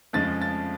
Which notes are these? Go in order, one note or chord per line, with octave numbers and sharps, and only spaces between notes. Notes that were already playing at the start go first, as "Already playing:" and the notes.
F2 C#3 F3 G#3 A6
A6